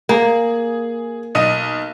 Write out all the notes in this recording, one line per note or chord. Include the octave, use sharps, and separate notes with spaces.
A#3 G#4
B1 D#5 D#7